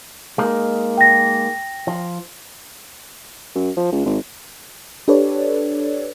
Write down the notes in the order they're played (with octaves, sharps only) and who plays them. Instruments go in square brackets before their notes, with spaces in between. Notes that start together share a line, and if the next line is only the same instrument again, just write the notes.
[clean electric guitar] G#3 A#3 D#4
[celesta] G5 A#6
[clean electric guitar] F3
[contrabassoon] F#2
F3
C#2
G#1
[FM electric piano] D4 G4 A4 B4 C#5 D5